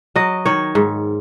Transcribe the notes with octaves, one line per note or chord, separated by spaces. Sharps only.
F#3 D#5
D#3 C#5
G#2